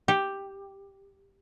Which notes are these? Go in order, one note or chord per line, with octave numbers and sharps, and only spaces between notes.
G4